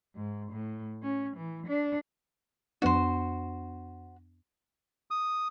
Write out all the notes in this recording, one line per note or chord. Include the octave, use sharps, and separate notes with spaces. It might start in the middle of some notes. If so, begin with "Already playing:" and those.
G#2
A2
C#4
E3
D4
F2 B3 D4 F#4 C5
D#6